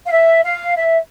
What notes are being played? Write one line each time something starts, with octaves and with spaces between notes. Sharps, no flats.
F5
E5
F5
E5